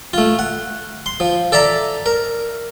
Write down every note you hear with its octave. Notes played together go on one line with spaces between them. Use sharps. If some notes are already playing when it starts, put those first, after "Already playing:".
A3 F4
F#5
C6
F3
A4 D5 E5 A5 A#5
A#4